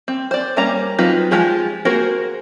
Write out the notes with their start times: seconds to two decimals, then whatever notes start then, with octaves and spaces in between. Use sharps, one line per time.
0.08 C4
0.31 C5 D5
0.57 G3 A#3 C#4 A#5
0.98 F#3 C4 D#4 F4 B4
1.31 F3 G#3 F4 G4 G#4
1.85 A#3 F#4 G#4 A#4 C5